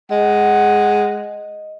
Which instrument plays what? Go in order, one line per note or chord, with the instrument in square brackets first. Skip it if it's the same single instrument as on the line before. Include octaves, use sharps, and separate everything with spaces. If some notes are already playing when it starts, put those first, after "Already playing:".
[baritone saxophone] G#3 [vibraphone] D#5 [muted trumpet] F#5